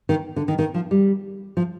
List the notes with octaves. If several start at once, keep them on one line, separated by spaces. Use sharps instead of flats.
D#3
D3
D#3
D#3
F3
G3
F3